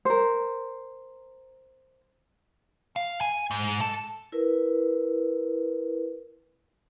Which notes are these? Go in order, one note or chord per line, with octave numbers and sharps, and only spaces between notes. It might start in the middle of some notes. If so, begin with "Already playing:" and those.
A#4 C5
F5
G#5
G#2
A4
E4 A#4 B4